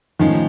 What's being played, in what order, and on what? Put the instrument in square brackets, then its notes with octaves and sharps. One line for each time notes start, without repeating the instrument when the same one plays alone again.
[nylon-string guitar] A2 F3 G#3 C#4 F4 [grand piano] D#3